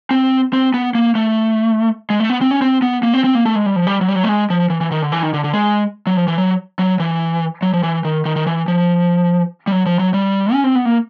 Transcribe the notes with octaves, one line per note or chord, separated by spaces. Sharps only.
C4
C4
B3
A#3
A3
G#3
A3
B3
C4
C#4
C4
B3
A#3
C4
C4
A#3
A3
G#3
G3
F3
G3
F#3
G3
F#3
A3
G#3
F3
E3
E3
D#3
D3
E3
D#3
D3
D3
G#3
F#3
F3
E3
F#3
F#3
E3
F#3
F3
E3
D#3
D#3
D#3
E3
F3
G3
F#3
F3
F#3
G3
C#4
C4
B3
A#3